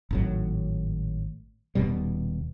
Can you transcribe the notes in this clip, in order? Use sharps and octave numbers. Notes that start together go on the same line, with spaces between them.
G#1 A2 F#3
D#1 B2 G3